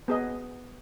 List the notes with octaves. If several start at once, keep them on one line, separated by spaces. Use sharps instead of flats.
B3 G#4 D#5